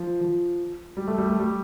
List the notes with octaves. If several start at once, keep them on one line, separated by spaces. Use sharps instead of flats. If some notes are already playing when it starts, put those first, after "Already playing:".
Already playing: F3
F3
G3
A3
G3
A3
G3